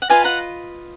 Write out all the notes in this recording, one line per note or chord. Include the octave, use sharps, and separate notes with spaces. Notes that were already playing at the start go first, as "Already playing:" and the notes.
F#5
F4 B4 D#5 F5 G#5
F#5 A#5